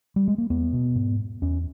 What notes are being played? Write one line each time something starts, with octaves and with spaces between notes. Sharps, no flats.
G3
G#3
A#3
E2 B3
B2
G#2
E2 C#4